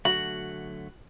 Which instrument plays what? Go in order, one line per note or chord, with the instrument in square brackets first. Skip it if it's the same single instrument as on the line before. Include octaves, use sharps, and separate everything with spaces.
[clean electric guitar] D3 F#3 A3 [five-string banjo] F#4 [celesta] F#7